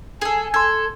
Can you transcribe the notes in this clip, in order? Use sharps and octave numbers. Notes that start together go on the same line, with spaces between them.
G#4 A4 G#5
A4 C6 G#6